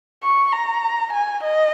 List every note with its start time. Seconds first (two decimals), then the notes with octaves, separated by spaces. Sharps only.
0.23 C#6
0.53 A#5
1.13 G#5
1.44 D#5